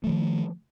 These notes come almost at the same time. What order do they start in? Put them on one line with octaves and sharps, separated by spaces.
A3 F3 D#3